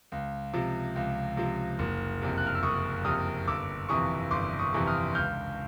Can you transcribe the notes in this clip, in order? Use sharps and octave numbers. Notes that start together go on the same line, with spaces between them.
C#2
C3 F3
C#2
C3 F3
F#1
F2 C3
F#6
F6
E6
F#1 C#6 D#6
F2 C3 D#6 F6
G1 D6 E6
F2 C3 E3 C#6 D#6
G1 C6 D6
C#6 D#6
F2 C3 E3
D#6 F6
C#2 F6 G6